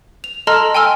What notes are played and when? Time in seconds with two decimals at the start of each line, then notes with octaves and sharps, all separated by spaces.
0.24 F7
0.47 A4 D#5 A5 A#5 C6 F6
0.74 G5 G#5 C6 E6 F6